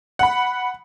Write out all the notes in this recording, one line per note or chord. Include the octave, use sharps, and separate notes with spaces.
F#5 B5